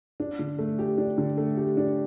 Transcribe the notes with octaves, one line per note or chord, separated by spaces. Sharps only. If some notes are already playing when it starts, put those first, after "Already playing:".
D4
D3
A3
G4
D4
D3
A3
G4
D4